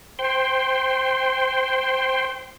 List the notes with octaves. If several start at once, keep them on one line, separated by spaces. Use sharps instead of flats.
C5 G5 C6